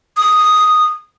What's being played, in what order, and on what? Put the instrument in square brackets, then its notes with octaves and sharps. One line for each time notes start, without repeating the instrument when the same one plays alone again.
[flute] D#6